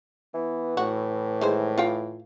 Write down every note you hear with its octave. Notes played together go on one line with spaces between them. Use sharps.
E3 B3
A2 F#4
D#3 G#3 C5
F4 F5 G5